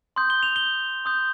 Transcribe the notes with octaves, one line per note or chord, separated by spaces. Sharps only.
C6 D#6 G6
G7
F7
G7
C6 D#6 G6